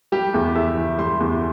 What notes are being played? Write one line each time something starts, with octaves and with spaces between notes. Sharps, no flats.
G3 G4
E2
E2 E5
E3
G3 C6
E2